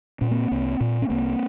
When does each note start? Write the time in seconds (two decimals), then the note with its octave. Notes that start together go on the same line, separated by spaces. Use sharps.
0.21 A#2 C#4
0.31 A#3 C4
0.51 C2
0.81 A#2
1.02 C#4
1.10 C2 A#3 C4